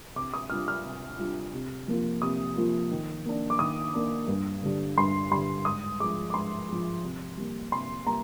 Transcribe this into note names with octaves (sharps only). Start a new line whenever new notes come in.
C3 D6
D#6
G3 D4 F4 F6
F6
C3
G3 D4 F4
C3
F3 A#3 F4
C3 D#6
F3 A#3 F4
D#3
A#3 D4
D6
D#3 D#6
A#3 D4
G2
D3 G3 D4
G2 C6
D3 G3 D4 C6
G#2 D#6
F3 G#3 D6
D6
G#2 C6
F3 G#3
C3
G3 A#3
C3 C6
G3 A#3 A#5